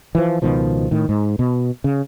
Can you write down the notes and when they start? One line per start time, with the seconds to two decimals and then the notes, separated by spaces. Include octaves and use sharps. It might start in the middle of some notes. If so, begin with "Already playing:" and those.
0.15 E3 F3
0.42 C#2 B2 D#3 F3
0.91 A2 D#3
1.09 G#2
1.39 B2
1.84 C#3